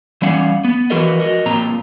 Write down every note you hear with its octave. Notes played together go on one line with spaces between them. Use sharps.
E3 G3 C#4 F5 F#5
B3
E3 F3 F#4 A#4 B4 D#5
F#4 A#4 D#5
A#2 F3 C4 A#5